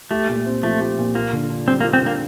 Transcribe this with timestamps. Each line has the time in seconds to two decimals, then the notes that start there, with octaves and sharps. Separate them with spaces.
0.11 A3 G4
0.29 A#2
0.46 C4
0.63 F3 A3
0.80 G4
0.98 A#2
1.14 A#3 F4
1.33 D3
1.49 D4
1.67 G3 C4
1.81 A#3
1.84 F4
1.93 C4
2.02 D3 A#3